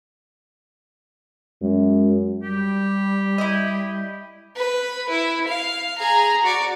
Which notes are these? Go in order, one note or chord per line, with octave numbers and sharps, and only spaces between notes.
F#2 G#3
G3 G4
E4 D#5
B4
E4
F5
G#4 A#5
F#4 D5